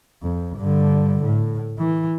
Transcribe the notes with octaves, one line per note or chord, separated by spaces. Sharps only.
F2
G2 D3
A2
E3